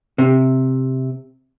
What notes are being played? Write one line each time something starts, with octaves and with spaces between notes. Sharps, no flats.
C3